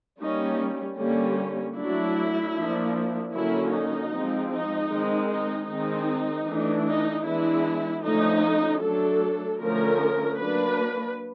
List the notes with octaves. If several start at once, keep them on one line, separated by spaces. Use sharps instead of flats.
G3 A#3 C#4 D#4
D3 G3 A#3 C#4
F#3 A3 D4 E4
F3 A#3 D4
D3 F#3 A#3 C#4 E4
D#4
F3 G#3 C4
D#4
D#3 G#3 C4
D#4
D#3 G#3 C4 D#4
E3 A3 D4
D#4
E3 G#3 B3 D4 E4
D3 F3 A3 C#4 D#4
F#3 A3 D4 A4
D3 F3 A3 C#4 A#4
F#3 A#3 D4 B4